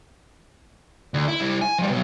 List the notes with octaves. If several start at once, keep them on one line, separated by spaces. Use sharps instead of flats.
D2
E4
G3 E4
G#5
F3 G3
B2 F#3